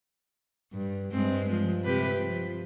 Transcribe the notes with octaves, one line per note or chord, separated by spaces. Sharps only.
G2
G2 G#3 C4
F3 G#3
C3 G4 B4
F3